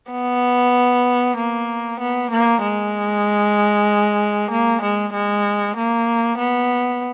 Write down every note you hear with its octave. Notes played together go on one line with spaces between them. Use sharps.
B3
A#3
B3
A#3
G#3
A#3
G#3
G#3
A#3
B3